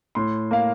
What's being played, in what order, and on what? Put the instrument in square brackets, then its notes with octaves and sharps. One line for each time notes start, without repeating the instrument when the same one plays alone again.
[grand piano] A2 C6
A#3 F5